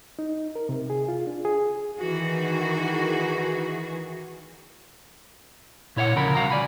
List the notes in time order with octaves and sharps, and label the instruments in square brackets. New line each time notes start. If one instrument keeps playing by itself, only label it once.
[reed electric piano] D#4
A#4
C3
G#4
F4
D4
G#4
[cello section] D#3 E3 F#4 G#4
[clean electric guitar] A#2 E4 C#5 F5 F#5
D2 C#3 F3 A#4 B5
C2 G#3 F#4 F5 F#5 A#5
D5 G#5 B5